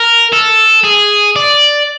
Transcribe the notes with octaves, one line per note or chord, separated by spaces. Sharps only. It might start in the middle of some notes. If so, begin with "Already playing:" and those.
Already playing: A#4
A4
G#4
D5